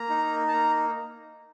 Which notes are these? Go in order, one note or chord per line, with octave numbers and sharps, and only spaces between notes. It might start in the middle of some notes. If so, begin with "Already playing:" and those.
Already playing: A#3 A#5
D#4
A5
A#3 A#5